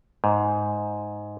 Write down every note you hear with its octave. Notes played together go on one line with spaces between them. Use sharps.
G#2